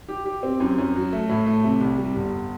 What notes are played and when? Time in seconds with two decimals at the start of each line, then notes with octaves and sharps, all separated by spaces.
0.08 G4
0.25 G4
0.43 C4
0.60 F#2
0.78 F#2
0.95 F#3
1.13 A3
1.29 A2
1.46 A3
1.64 C3
1.81 C2
1.98 G3
2.16 G1